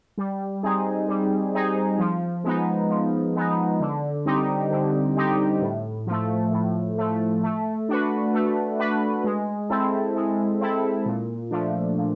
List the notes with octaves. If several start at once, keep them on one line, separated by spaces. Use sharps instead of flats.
G3
C4 D#4 G#4
G3
C4 D#4 G#4
F3
G#3 B3 D#4
F3
G#3 B3 D#4
D3
G3 C4 D#4 G4
D3
G3 C4 D#4 G4
A2
F3 A3
A2
F3 A3
A3
D4 F#4 B4
A3
D4 F#4 B4
G#3
C4 E4 A4
G#3
C4 E4 A4
A#2
F3 A3 D4
A#2